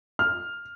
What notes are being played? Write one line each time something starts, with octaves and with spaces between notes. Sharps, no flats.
F6